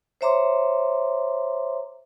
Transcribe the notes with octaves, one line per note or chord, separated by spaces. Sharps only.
C5 C#5 E5 A#5 C6 D6